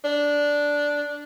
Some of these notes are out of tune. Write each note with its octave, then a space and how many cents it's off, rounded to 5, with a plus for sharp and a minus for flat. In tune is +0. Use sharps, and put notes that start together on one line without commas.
D4 -5